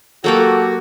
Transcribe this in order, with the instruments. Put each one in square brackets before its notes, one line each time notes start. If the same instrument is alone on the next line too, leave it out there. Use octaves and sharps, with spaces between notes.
[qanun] F#3 A#3 G4 [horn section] F#4 [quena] A4